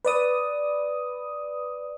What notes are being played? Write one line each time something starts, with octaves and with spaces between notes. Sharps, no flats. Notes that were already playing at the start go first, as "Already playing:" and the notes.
B4 D5 D#6